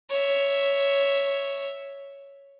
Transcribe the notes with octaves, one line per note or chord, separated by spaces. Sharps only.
C#5 E5